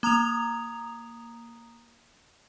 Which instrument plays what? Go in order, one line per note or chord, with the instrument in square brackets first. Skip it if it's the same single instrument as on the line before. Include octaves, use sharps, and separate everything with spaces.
[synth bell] A#3 A#5 D#6 F7